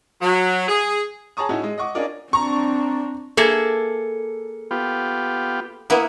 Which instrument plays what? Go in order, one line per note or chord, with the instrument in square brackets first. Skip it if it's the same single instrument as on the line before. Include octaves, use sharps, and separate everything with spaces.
[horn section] F#3
G#4
[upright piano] G#4 C#5 A5 A#5 C#6 D#6
A2 C#4 D#4 E4 F#4
G#3 D#5
D#5 F#5 C#6 D6
C#4 D4 F4 A#4 D5 D#5
[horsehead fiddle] C4 D4 [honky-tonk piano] A#5 C#6
[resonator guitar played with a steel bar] A#3 G#4 A4 [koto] E5
[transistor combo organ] B3 F4 G4
[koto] A#3 B3 E4 [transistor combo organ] F#5 D#6